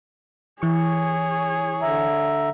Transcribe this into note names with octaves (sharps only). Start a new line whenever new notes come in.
E3 G#4 C#5 C#6
D3 E5 A#5